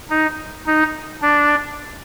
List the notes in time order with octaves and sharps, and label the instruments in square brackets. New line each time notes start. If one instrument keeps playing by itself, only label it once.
[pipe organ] D#4
D#4
D4